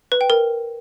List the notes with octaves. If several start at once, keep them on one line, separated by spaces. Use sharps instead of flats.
B4
G5
A#4